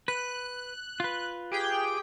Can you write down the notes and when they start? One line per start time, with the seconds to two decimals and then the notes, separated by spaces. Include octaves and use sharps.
0.08 B4 F#6
1.00 F4 B4
1.52 G4 G#4 G5